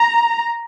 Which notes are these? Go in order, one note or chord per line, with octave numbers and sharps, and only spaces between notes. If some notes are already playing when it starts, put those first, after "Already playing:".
Already playing: A#5